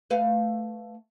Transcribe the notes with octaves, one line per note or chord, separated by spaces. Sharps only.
A3 B4 F5